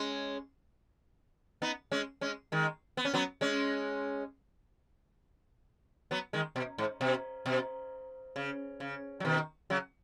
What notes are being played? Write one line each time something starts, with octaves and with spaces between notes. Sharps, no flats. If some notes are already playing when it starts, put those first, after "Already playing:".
Already playing: G#3 C#4
B3 D#4
G#3 C#4
G#3 C#4
D#3 G#3
B3
C#4
F#3 B3
G#3 C#4
F#3 B3
D#3 G#3
B2
G#2
B2
B2
C#3
C#3
F#3
B2 D#3
C#3 F#3